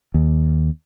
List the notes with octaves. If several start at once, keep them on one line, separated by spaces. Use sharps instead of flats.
D#2